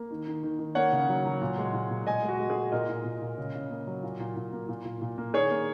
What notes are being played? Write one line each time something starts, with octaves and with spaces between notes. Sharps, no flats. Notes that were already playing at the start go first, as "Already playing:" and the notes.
Already playing: A#3
D#3
D#3
D#3
D#3
A#3 C#5 F#5
C#3
F#3
F#3
A#2
G#3
A#2
A#2
G#3 D#5 G#5
G#3
F#4
G#3
G#4
G#3
A#2 A#4 D#5
A#2
A#2
A#2
C#3
C#3
A#3
F#3
A#2
A#2
A#2
A#3
A#2
A#2
A#2
A#3
D#3 G#4 C#5
A#3